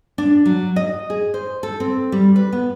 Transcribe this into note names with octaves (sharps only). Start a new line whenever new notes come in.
D4
F#3
D#5
G#4
C5
A4
C4
G3
B4
B3